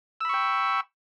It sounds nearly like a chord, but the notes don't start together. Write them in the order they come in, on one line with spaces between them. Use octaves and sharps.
E6 B5 C#6 G5